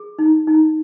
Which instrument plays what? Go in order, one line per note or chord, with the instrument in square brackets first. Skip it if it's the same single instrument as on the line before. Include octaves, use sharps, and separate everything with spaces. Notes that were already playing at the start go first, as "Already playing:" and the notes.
Already playing: [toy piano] G#4
D#4
D#4